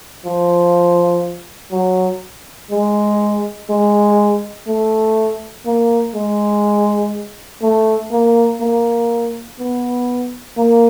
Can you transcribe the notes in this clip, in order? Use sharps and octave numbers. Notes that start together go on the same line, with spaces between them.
F3
F#3
G#3
G#3
A3
A#3
G#3
A3
A#3
A#3
B3
A#3